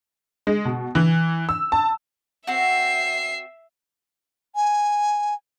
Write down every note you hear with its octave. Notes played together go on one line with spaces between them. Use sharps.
G#3
B2
E3
E6
A5
C4 F#4 E5 C7
G#5